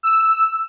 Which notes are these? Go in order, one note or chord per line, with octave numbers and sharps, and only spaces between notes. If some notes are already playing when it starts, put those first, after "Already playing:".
E6